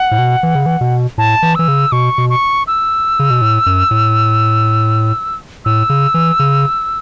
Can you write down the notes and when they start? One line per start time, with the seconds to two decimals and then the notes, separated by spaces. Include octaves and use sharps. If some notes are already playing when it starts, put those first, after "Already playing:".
Already playing: F#5
0.11 A2
0.18 B2
0.43 E3
0.55 C#3
0.66 E3
0.81 B2
1.18 A2 A5
1.43 E3
1.55 E3 E6
1.68 C#3
1.92 B2 C#6
2.18 B2
2.30 C#6
2.67 E6
3.19 C#3
3.30 B2
3.41 A2
3.66 F#2
3.91 A2
5.65 A2 E6
5.90 C#3
6.14 E3
6.39 C#3